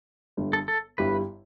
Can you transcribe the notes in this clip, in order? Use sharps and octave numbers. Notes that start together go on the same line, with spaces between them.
G1 G2 D3 G3
A4
A4
G1 G2 G3 E4 G4 B4